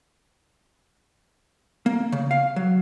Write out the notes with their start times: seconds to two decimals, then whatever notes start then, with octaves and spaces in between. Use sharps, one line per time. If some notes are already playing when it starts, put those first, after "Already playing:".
1.86 A#3
2.12 C#3
2.31 F5
2.56 F#3